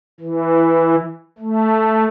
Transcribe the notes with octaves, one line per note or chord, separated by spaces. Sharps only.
E3
A3